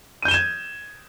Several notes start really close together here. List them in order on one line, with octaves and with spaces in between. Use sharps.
D#7 G6 G7 E7 G#6